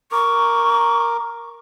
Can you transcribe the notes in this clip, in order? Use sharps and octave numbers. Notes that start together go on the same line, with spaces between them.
A#4 C#6 D6